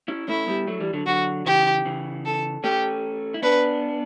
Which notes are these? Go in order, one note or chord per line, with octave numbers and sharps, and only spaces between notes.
C#4 E4
A3 C#4 E4
G3 B3
F#3 A3
E3 G3
D3 F#3
D3 F#3 F#4
C#3 E3 G4
C#3 E3
A4
A3 C#4 G4
E4
B3 D4 B4